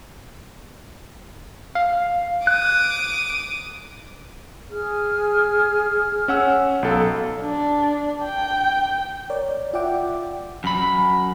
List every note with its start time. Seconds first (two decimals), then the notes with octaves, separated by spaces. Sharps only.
1.75 F5
2.47 D6 D#6 F#6
4.71 G#4 F6
6.28 C#4 F#5 E6
6.83 B1 A4 F5
7.42 D4
8.24 G5
9.30 A#4 C#5 D5
9.73 F4 D5 E5 F#5 G5 D6
10.64 F#2 B5